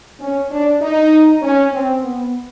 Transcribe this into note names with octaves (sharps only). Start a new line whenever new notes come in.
C#4
D4
D#4
C#4
C4
B3